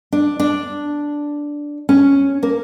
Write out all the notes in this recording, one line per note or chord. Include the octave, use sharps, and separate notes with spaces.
D4
D4
C#4
A#3